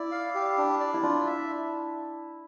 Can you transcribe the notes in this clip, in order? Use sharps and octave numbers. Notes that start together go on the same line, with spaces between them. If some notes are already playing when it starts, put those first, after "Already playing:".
Already playing: E4 D5
F5
G4
D4
D5
E4
D4 F4
E5